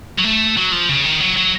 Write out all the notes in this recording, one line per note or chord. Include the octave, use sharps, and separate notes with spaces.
F#3
A3
F#3
F3
C#3
D#3
F#3
F#3